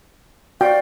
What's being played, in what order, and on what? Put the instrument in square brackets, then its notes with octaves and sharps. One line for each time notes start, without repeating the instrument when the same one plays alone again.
[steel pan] F#4 G5 [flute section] D5 F5